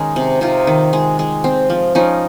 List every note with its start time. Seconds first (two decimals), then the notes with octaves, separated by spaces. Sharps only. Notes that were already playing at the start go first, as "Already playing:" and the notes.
Already playing: D#3 G#3 C#4 D#4
0.16 C3
0.41 C3 D#4 F4
0.67 D#3
0.93 G#3
1.19 G#3
1.44 C4
1.70 F3
1.95 F3 C#4 D#4